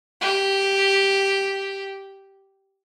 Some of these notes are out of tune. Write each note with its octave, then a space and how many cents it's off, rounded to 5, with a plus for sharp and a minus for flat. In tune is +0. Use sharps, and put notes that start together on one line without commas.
G4 -5